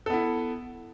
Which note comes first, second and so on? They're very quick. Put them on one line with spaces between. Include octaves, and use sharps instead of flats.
A4 B3 E4